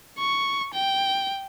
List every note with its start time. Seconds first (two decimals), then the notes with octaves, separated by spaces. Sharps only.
0.19 C#6
0.74 G5